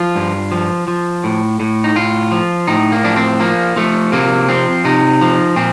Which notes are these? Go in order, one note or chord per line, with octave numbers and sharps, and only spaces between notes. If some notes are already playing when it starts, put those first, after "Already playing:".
Already playing: F3 F4
G2
F3
F3
A2
A2
D#4
A2 F4
F3
A2 D#4
A#3
F3 D4
C4
F3 A#3
F3 A3
C3 A#3
F3 C4
C3 D#4
F3
A#2 C4